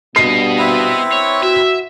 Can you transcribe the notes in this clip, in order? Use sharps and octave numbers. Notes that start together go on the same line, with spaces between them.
G2 B2 B3 D#5 C7
C4 E4 B4
C#5
F#4 E5